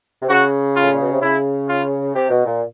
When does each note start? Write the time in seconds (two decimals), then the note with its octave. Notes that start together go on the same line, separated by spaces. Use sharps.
0.22 C3
0.29 C#3 F#4
0.76 F4
0.82 A2
0.92 A#2
1.02 B2
1.12 C3
1.22 C#3 E4
1.68 F4
2.15 C3 G4
2.30 B2
2.45 A#2